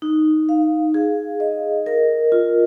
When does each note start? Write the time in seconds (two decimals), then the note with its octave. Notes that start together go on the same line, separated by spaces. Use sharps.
0.02 D#4
0.49 F5
0.94 G#4
1.40 D#5
1.86 A#4
2.32 F4